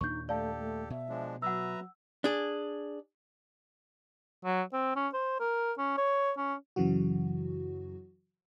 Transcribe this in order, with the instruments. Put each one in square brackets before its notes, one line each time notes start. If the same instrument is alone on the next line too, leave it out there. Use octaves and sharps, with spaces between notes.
[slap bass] D#2 A#2 D4 [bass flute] D#4 [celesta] C#6 G6
[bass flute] A3 [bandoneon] G4 A4 [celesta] D5 F5 A5
[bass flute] A3
[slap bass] B2 [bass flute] E5
[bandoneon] F3 G#3 D4
[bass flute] F#3 [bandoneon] B4 E5 A#5 [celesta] F#5 E6
[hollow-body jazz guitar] D4 G#4
[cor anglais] F#3
C4
C#4
C5
A#4
C#4
C#5
C#4
[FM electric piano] F#2 C#3 E3 F#3 F#4